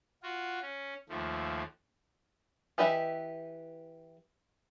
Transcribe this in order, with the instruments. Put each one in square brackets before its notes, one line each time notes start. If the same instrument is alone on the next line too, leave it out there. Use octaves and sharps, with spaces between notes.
[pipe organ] F4 F#4
C#4
D#2 F3 A3
[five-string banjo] E3 G4 B4 D#5 E5